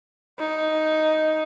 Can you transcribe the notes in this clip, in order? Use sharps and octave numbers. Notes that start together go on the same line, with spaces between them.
D#4